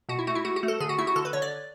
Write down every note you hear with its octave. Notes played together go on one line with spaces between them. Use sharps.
B2 F#4
E4
A3 F#4
E4
A3 F#4
F#4
A3
A4
D3 G#4
F#4
A3 E4
F#4
D3 A4
B4
D3 C#5
D5